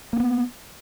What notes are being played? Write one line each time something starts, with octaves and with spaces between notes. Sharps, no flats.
A#3 B3 C#4